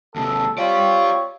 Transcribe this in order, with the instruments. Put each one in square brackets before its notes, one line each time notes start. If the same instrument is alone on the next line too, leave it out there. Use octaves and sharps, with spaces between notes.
[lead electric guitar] D#2 C3 [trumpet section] A4
[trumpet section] C4 C#5 [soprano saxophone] F4 [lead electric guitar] G4 D5